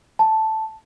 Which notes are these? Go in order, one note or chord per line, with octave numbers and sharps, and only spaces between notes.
A5